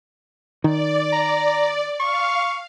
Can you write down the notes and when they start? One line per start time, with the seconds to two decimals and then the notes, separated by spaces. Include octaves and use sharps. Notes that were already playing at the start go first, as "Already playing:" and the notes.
0.64 D#3 D5
1.13 A#5
2.00 F5 C#6